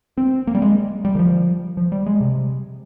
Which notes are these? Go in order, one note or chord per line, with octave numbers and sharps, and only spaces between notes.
C4
A#3
G3
G#3
G3
D#3
F3
F3
G3
G#3
C3